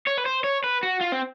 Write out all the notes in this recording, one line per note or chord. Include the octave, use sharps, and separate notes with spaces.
C#5
B4
C5
C#5
B4
F#4
F4
C4